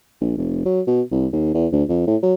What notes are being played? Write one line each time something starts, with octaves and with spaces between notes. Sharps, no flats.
A#1
F1
F#3
B2
C2
D#2
E2
D2
F2
A2
F#3